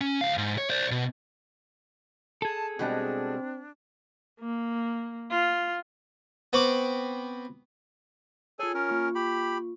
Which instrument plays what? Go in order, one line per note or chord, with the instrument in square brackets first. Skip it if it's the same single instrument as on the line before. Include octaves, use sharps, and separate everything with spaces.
[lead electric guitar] C#4
D2 F5
G#2
C#5
C5 D5
B2
[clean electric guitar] G#4 A4 [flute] A5
[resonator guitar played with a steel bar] B2 G3 G#3 [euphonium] C4 [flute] D4
[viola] A#3
F4
[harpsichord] B3 C4 B5 C#6 D6
[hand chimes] F4 C#5 [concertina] G#4 A4 G#5
[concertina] C#4 A#4
[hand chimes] A#3 F4 C#6
[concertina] G4 B5